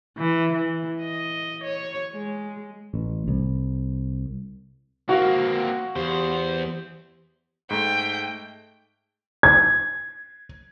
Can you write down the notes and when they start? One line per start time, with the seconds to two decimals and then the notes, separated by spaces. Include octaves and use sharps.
0.18 E3
0.53 E3
1.02 D#5
1.64 C#5
2.14 G#3
2.94 A1
3.28 C2
5.09 A#3 C4 F#4 F5
5.96 E2 G4 C5
7.70 G#2 A3 G5
9.43 G#6